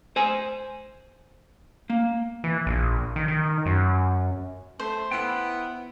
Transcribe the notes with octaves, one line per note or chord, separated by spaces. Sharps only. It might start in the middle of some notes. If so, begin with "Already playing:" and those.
C5 G#5
A#3
E3
A#1
D#3
D#3
F#2
A3 C5
B3 E4 G5